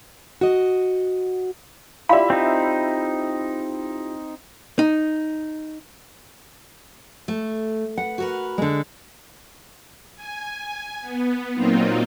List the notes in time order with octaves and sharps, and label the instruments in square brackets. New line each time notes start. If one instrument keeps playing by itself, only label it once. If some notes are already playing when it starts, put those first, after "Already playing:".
[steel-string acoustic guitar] F#4 D#5
[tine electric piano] E4 F4 G4 [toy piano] D5 F5 [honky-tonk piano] E5 B5
[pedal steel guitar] C4 D#4
[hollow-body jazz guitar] D#4
[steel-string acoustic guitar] A3
[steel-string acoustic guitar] B4 [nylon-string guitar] F#5
[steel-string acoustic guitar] F#4 A#4 B4
[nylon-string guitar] D3 G#3
[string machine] G#5
B3
A#2 F#3 A#3 C4 D#4 F4